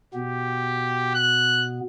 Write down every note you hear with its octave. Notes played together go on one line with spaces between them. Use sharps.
B2 B3 G4
F#6